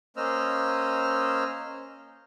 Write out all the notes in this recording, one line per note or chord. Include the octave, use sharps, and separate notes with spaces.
A#3 C#4 C5 D#5 E6 F6